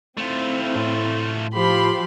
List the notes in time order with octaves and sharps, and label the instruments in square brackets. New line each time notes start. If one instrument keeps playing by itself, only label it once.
[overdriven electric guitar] A3 F4 [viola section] C4 E4
[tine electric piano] A2
[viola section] F3 G4 [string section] B5 C6